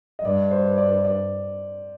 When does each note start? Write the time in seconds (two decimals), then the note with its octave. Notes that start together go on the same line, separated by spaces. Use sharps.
0.19 D#5
0.24 G2 D5
0.51 C5
0.78 D5
1.05 D5